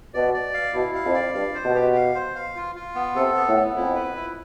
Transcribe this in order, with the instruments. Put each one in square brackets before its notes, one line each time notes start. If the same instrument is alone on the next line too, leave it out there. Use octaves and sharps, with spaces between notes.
[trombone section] B2 [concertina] D5
[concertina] D5
F5
[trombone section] B2 [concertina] E4
[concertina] F5
[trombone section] F2
[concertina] D5
[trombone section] G2 [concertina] F5
[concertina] C5
[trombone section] B2
[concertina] G4
F5
C5
F5
F4
F4
B3
[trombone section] C3 [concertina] A4
[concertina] B3
[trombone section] A2
[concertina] B3
[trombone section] F2 [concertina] E4
[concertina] B4
E4